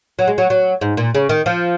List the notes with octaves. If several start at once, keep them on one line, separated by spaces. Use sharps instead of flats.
F#3
G#3
F#3
F#3
G#2
A#2
C#3
D#3
F3